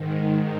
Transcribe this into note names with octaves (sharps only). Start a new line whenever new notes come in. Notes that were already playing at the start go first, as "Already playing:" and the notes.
Already playing: G#2 D#3